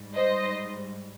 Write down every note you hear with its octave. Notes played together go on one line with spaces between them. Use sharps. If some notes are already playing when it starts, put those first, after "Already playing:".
Already playing: G#2 G3
C5 D#5